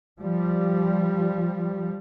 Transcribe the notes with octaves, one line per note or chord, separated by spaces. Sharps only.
F3 G3